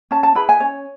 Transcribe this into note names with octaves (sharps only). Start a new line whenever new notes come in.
C#4 A5
A5
E4 G#4 B4 B5
G#5
C#4 C#5